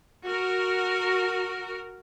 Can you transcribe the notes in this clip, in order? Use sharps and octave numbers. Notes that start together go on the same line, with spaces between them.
F#4 A#4